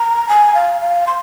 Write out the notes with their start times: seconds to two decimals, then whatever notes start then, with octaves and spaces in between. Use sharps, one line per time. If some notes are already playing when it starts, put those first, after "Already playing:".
Already playing: A#5
0.29 G#5
0.55 F5
0.81 F5
1.07 C6